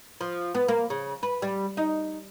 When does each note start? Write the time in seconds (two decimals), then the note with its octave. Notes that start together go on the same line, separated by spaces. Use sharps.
0.21 F3
0.55 B3
0.68 A#3
0.90 C#3
1.23 B4
1.42 G3
1.77 D#4